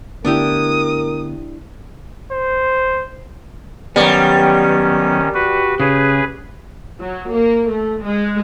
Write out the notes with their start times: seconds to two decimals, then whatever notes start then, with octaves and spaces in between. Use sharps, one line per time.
0.25 D3 A3 B3 D4 E4 G4 A#4 D#6
2.31 C5
3.96 D#3 F#3 G3 B3 C#4
5.34 F#4 B4
5.80 C#3 G#4 B4
6.99 F#3
7.30 A#3
7.69 A3
8.03 G#3